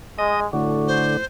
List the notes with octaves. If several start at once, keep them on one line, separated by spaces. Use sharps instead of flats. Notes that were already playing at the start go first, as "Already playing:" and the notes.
G#3 D#5
A2 D3 F#4
C5